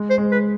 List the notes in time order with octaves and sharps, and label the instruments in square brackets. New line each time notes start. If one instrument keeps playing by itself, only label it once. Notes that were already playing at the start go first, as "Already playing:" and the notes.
Already playing: [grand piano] G#3
[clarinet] C5
[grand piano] G#3
[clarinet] B4